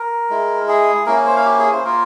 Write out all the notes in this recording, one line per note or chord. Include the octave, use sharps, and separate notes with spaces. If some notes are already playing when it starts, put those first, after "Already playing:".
Already playing: A#4
G#3 E4
G#4
A#3 C#4 E4 A#4
C5
F5
G4
G#4
C5
A#3 F4 A#4